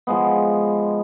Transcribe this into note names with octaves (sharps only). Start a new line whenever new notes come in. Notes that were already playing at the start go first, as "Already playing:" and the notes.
F3 G#3 B3